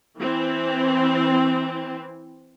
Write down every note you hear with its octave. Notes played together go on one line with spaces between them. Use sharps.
E3 C4